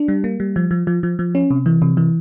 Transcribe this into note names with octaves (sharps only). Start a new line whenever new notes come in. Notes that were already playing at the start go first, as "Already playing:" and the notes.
Already playing: D4
G3
A#3
G3
F3
F3
F3
F3
F3
C#4
C3
E3
C3
E3